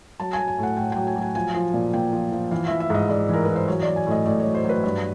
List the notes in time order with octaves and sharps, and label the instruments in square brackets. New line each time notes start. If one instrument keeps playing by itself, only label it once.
[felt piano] F#3 A5
F#3 G#5
G#5
A2 F#5
A2 G5
F#3 G5
G#5
F#3
G#5
F3 G#5
F3
A#2
A#2 G5
F3
F3
E3 F5
E3 E5
E5
G#2 D#5
G#2 D5
E3 A#4
E3 B4
C5
F#3 C#5
F#3 D5
G#5
A2 D#5
A2 D5
C#5
F#3
C5
F#3
B4
G2